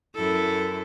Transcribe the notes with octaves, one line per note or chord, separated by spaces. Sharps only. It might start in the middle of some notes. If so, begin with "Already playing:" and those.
F#2 E4 A4